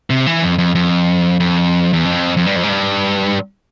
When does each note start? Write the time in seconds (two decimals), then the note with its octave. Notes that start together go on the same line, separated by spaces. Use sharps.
0.10 C3
0.26 E3
0.42 F2
0.58 F2
0.75 F2
1.40 F2
1.93 E2
2.05 F2
2.37 F2
2.46 G2
2.56 F2
2.63 G#2
2.69 G2